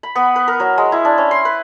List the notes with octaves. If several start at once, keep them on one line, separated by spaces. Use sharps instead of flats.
B5
B3
B4
A#4
F#3
G#3
E4
D4
C#4
C6
B4